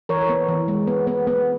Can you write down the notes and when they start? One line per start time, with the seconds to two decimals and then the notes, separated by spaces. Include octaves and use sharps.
0.09 E3 A#4 C#5
0.29 B3
0.48 E3
0.68 G#3
0.87 B3
1.07 B3
1.27 B3